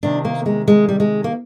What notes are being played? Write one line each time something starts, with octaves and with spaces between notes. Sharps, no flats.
C3 D#3 D4
A#3
G#3
G#3
G3
G#3
A#3